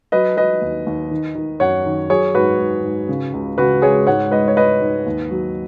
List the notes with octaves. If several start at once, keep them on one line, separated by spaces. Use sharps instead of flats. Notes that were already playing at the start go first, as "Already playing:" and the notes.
F#3 B4 D#5
F#3 B4 D#5
D#2
D#2
D#3
D#3
F#2 C#5 F#5
D#3
F#3 G#4 C#5
G#2 F#4 B4
G#2
G#2
C#3
C#2
C#3 F#4 B4
G#3 G#4 C#5
G#2 C#5 F#5
G#2 B4 D#5
C#5
G#3 B4 D#5
G#2
D#2
F#3